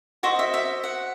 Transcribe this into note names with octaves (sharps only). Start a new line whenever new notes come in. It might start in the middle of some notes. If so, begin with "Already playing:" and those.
F#4 C5 D#5 E5
E5
E5
F#5